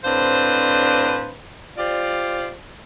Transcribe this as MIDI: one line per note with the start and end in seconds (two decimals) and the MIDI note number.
0.04 1.33 45
0.04 1.33 60
0.04 1.33 62
0.04 1.33 71
0.04 1.33 72
0.04 1.33 77
1.78 2.54 65
1.78 2.54 67
1.78 2.54 72
1.78 2.54 74